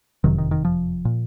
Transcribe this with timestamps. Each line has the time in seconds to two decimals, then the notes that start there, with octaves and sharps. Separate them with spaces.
0.24 F#1 F2 C3 D#3 F#3
0.38 D#3
0.51 D#3
0.65 F3
1.05 A#2